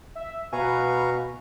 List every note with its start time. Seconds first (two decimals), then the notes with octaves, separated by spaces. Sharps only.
0.15 E5
0.53 B2 B4 F5 G#5 A#5 C#6